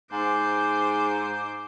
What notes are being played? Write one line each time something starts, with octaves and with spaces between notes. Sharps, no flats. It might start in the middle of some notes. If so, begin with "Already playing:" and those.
G#2 C5 D6